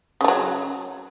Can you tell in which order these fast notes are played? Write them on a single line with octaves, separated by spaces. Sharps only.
C#3 A3 F#3